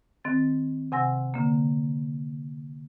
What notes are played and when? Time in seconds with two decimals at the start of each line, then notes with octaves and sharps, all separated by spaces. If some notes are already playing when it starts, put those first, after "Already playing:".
0.25 D#3 C4 A6
0.92 C3 F#5 G#5 C6 E6 A#6
1.34 D3 A#3